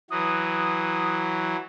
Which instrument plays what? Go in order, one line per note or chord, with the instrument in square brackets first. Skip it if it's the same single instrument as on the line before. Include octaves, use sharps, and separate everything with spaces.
[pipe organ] E3 F#3 [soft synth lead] D#6